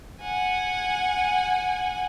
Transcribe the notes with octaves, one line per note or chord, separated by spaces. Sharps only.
F#5 G#5